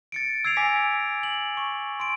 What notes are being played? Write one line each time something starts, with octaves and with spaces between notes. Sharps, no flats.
A6 C#7 D7
E6 G#6 C7 D7 F7
G#5 D6 A#6 B6
F#7
C#6
C6 D7